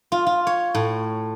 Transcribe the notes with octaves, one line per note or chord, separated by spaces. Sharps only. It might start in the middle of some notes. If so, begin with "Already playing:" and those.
F4
F4
C#5
A2